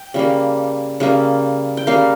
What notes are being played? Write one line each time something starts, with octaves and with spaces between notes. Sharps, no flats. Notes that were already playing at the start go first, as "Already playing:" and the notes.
Already playing: G5
C#3 G3 A#3
C#3 G3 A#3
G5
C#3 G3 A#3 F5